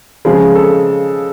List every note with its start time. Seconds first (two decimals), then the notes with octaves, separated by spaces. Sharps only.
0.25 C#3 F3 G#3
0.55 A4